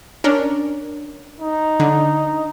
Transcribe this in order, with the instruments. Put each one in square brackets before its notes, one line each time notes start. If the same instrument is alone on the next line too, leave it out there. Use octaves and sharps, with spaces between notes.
[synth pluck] C#4 D4 A#4
[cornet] D#4
[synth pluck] D3